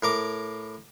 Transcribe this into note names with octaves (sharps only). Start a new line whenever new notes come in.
A2 A#4 D6